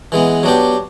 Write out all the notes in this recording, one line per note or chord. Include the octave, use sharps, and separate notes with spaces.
E3 G#3 B3
F#3 B3 D4 G4